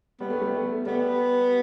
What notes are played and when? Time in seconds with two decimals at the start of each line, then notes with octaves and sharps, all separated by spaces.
0.20 G3 B3
0.30 A3
0.42 G3
0.54 A3
0.86 G3 B3